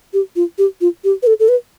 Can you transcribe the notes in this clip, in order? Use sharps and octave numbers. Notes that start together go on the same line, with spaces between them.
G4
F4
G4
F4
G4
B4
A4
A4
B4